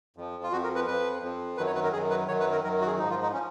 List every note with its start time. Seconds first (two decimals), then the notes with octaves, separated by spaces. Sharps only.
0.16 F2 F3
0.43 F4
0.52 F2 F3 F#4
0.64 A#4
0.75 B4
0.88 F2 F3 B4
1.22 F2 F3
1.57 F#2 D#3 F#3 B4
1.67 C#5
1.75 B4
1.84 A#4
1.93 F#2 D#3 F#3 G#4
2.10 B4
2.28 F#2 D#3 F#3 C#5
2.40 B4
2.52 A#4
2.64 F#2 D#3 F#3 A#4
2.81 F#4
2.87 G#4
2.99 G#2 F3 D#4
3.10 F4
3.23 D#4
3.33 F3 C#4